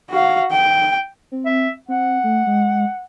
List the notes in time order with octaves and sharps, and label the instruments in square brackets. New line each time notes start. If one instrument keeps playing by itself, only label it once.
[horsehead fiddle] F#4 F5
G5
[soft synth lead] C4
[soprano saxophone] E5
[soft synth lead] C4 [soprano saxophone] F#5
[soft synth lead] A3
G#3